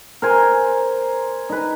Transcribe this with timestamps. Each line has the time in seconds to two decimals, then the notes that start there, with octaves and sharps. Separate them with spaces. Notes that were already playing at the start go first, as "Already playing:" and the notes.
0.22 A#4 C5 G#5
1.49 D#4 B4